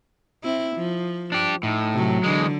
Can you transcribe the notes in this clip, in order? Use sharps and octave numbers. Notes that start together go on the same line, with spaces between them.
C4 E4
F3
D4 G4
A2 D#4
C3 F#3
D3 E3 G#3